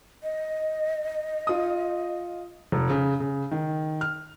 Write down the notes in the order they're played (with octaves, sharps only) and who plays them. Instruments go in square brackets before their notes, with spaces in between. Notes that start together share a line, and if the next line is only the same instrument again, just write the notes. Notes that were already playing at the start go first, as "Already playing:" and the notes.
[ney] D#5
[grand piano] F4 D#6
[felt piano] F1
C#3
C#3
D#3
F6